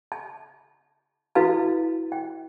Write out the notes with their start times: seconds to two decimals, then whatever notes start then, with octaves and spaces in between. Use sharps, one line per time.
0.12 A5
1.35 E4 F#4 A4 B4 F5 A5
2.12 G5